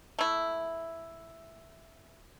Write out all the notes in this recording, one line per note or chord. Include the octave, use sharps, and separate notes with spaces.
A3 E4